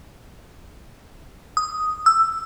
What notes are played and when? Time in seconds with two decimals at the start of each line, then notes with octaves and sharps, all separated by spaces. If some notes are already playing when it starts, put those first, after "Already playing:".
1.57 D#6
2.06 E6